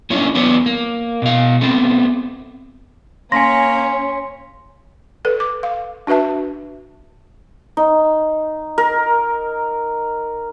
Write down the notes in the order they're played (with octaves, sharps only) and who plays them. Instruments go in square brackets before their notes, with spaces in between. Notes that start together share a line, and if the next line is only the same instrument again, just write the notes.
[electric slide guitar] A#3 C#4 D4 E4 C#5
E2 B3 D4 B4 C#5
A#3
B2 F5
A3 B3 C4
[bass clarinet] A#3 [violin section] C#4 [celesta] G#5 A#6 [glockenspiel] C6 B6 C#7
[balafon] A4 B4
D6
F5
D4 F#4 B4 E5 A5
[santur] D#4
A#4